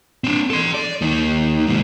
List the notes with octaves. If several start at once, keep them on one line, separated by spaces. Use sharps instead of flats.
C4 D4
A4 C6
D5
D#2 D#3
G#2 C3